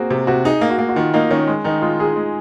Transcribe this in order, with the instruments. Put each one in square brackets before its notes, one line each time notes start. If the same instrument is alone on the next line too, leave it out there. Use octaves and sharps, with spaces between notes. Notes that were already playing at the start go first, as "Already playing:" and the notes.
Already playing: [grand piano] A#3 C4 F#4 G#4
[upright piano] C3
[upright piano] C3 [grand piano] F#4
[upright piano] D#4 [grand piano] G#4
[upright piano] A#3
[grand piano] F#4
[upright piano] A#3
[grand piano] F#4
[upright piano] D#3 [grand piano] F4
[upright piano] A#3 [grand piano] D#4
[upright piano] D#3 [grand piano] C#4
[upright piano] G#3
[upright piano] D#3 [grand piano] D#4
[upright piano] G#3 [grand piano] F4
[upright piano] G#3 [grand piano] G#4
[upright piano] G#3